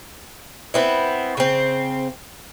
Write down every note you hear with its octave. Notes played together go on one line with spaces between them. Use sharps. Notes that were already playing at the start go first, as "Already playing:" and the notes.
B3 C4 E4
C#3 C4